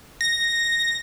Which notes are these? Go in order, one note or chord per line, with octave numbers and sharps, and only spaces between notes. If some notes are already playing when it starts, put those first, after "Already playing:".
A#6